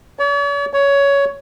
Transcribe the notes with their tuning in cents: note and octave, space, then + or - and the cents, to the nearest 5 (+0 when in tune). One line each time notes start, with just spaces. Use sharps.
C#5 +45
C#5 +15